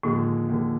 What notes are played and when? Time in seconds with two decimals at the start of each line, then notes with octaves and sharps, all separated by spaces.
0.03 D#2 A2 D3 F3 G#3
0.49 D#2 D3 F3 G#3